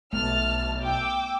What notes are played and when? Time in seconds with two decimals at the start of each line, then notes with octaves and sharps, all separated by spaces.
0.13 B1 A3 B3 A5 F6
0.83 G5 D6 E6